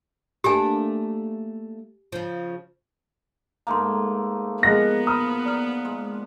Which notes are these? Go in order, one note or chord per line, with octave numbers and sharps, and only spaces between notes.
A3 A#3 D4 G4 G#5
C#3 F3
G#2 A3 A#3 A#5 C6
F3 G#3 B3 A#4 F#5 A#6
A#5 B5 D#6 F6
D5 A#5 F6
G#3